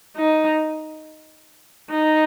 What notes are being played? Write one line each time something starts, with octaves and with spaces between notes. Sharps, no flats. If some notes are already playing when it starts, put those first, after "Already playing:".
D#4
D#4